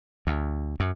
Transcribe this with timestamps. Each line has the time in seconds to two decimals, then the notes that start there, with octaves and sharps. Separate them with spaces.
0.27 D2
0.80 F#2